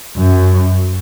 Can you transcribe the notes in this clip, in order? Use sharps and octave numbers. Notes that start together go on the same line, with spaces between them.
F#2